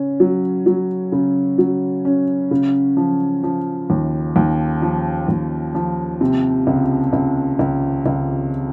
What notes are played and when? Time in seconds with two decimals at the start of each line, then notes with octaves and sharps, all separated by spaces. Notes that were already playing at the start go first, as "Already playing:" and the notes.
Already playing: C#3 C#4
0.20 F#3
0.66 F#3
1.12 C#3
1.58 F#3
2.05 C#4
2.51 C#3
2.97 F3
3.43 F3
3.90 D#2
4.36 D#2
4.82 F3
5.28 D#2
5.75 F3
6.21 C3
6.67 C#2
7.13 C#2
7.59 C#2
8.06 C#2